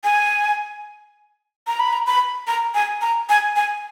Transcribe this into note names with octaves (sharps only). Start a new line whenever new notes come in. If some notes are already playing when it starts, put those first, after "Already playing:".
G#5
A#5
B5
A#5
B5
A#5
G#5
A#5
G#5
G#5